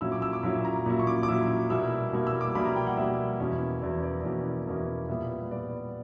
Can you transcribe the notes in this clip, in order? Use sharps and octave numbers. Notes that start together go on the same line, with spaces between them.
A#2 F#3 C#4 E4 E6
D6
E6
D6
A#2 F#3 C#4 E4 B5
A#5
A#2 F#3 C#4 E4
C#6
D6
D6
A#2 F#3 C#4 E4 E6
B2 G3 A#3 E4 E6
B2 G3 A#3 E4
E6
D6
B2 G3 A#3 E4 B5
A#5
G5
F#5
B2 G3 A#3 E4 E5
E2 B2 A#3 C#4 E4
E2 B2 A#3 C#4 E4 D5
D5
E2 B2 A#3 C#4 E4
E2 B2 A#3 C#4 E4
A#2 G3 B3 E5
A#2 G3 B3 D5